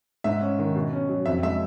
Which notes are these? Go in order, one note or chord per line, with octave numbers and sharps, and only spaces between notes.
G#2 E5
C#4
D#3
B2
C#4
F#3
F2 E5
G#3 E5